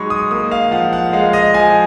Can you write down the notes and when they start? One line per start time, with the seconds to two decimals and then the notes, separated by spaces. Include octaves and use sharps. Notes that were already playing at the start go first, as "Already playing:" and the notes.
Already playing: F#3 G#3 D#4 B5 C#6
0.10 D#6
0.31 A#3 D#6
0.51 F5
0.71 F3 F#5
0.93 F#5
1.13 G#3 F5
1.33 D#5
1.54 F3 G#5